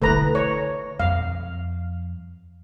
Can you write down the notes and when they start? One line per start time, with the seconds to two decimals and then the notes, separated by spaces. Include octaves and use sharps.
0.02 D3 A3 E4 B4 A#5
0.35 C#5
1.00 F2 F3 F5